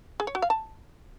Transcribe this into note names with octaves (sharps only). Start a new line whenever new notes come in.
G#4
C#5
F#4
F5
A5